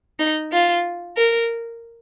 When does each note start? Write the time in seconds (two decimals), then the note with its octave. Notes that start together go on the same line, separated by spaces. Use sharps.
0.19 D#4
0.52 F4
1.17 A#4